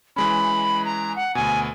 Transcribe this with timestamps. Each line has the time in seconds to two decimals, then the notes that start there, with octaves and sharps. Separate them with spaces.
0.16 E3 G#3 C#4 B5
0.85 A#5
1.16 F#5
1.35 D2 B2 G#5